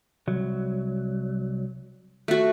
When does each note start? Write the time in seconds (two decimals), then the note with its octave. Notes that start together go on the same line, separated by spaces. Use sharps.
0.27 C2 F#3
2.28 A3 F#4